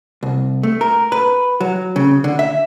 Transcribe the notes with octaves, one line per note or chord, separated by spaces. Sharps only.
C2
A3
A#4
B4
F#3
C#3
D3
E5